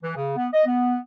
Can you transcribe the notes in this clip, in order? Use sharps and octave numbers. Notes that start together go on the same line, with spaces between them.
E3
C#3
B3
D#5
B3